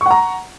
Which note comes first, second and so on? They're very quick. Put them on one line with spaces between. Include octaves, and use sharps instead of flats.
C#6 F#5 A#5